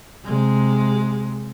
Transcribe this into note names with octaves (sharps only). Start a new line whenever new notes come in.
C3 G#3